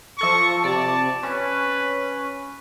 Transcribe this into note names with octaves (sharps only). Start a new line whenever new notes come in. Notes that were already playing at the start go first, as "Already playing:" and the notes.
F3 A4 C#6 A#6
C3 D5 A5
C#4 B4